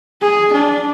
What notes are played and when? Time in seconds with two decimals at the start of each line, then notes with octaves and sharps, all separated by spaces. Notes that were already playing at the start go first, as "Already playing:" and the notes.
0.21 G#4
0.52 D4